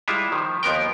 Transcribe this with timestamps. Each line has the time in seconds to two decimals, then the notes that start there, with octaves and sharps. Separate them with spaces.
0.08 G3 G#3 E4 F4 E5
0.32 D#3 F3
0.63 D#2 F3 B3 A#4 G5